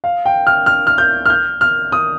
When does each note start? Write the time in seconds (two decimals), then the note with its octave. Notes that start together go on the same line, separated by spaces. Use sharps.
0.04 F5
0.26 G5
0.47 F6
0.66 F6
0.87 F6
0.98 G6
1.25 F6
1.30 G6
1.61 F6
1.92 D#6